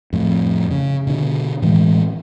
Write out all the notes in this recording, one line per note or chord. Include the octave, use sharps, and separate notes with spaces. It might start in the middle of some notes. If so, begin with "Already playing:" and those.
F2 A2
C#3
B2 D3
A2 E3 G#3